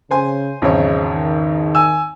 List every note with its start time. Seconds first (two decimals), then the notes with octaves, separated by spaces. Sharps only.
0.11 C#3 C5 G#5 C6
0.62 G#1 E2 C#3 F#3 C5 C#5 D#5
1.14 D#3
1.75 G#5 E6